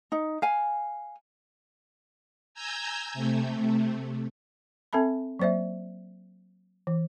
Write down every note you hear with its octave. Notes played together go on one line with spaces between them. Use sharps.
D#4
F5 G#5
G#5 A#5 E6 G6 G#6
C3 A3
C4 A4 E5 A5 B5
F#3 A#3 C5 D5 E5
E3